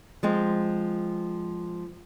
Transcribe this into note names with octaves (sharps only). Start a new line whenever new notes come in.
F3 G#3 C4